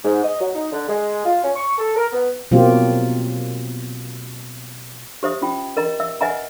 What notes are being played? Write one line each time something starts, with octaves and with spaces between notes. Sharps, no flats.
G#2
D#5
F#3
D#4
D3
G#3
F4
C#4
C#6
A4
A#4
B3
B2 F#3 A#3 C4 F4 G4
G4 C5 E5 D#6
C#4 F4 G5
A#4 D#5 A#5
E5 E6
B4 D#5 E5 F#5 G#5 A#5